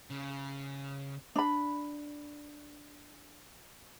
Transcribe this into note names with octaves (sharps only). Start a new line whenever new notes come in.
C#3
D4 B5